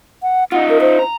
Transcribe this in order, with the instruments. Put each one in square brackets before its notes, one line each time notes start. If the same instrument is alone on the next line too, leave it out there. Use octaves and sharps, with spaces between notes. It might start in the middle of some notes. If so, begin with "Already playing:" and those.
[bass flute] F#5
[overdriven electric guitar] D#4 F4 [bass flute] F#5
[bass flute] A#4
C5
[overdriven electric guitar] A#5